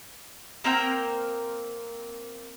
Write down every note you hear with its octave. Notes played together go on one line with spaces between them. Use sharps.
A#3 C4 A#4 G5